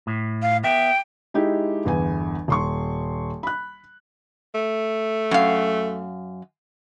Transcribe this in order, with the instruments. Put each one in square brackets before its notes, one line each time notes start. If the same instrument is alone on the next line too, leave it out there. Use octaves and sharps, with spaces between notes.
[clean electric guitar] A2
[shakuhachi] F5
[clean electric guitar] B3 E5 [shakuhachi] G5
[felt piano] G#3 D#4 E4 G4
G1 E2 G#5
D#1 C6 C#6
B5 F#6
[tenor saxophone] A3
[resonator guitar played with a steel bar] F#2 F5